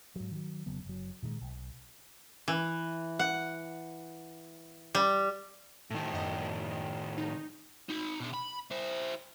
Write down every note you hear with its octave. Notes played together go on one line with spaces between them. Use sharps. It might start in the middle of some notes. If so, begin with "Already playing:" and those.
G#2 F#3
D#3 F#3
F1 C#3 F#3 B3
F#1 F#3
A#2 D#3 F#3 G#3
B1
E3
F#5
G3
A2 D#3
F#2 D#5
D#4
D#4 B5
B2 E5
B5
E4 C5